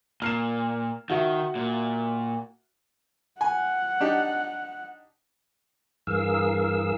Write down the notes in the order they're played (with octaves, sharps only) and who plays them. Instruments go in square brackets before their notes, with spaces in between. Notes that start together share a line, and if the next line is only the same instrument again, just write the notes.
[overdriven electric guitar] A#2 [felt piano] F6 C7 E7
[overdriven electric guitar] D#3 [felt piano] F#4 E5 F#5
[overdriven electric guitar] A#2
[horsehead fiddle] F#5 [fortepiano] G#5
[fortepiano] D4 D#4 G4
[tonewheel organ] G2 E3 G#4 A#4 F5 E6